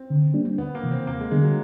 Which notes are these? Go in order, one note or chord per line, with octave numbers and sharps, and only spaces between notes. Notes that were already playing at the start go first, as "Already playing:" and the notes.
Already playing: C4
D3
G3 A#3 D4
D2 B3
A#3
C3 E3
C4
D#2 A#3
G#3
D3 G3 G#3 B3 D4
F#3